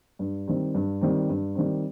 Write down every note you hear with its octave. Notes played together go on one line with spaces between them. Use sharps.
G2
D#3 G3 C4
G2
D#3 G3 C4
G2
D#3 G3 C4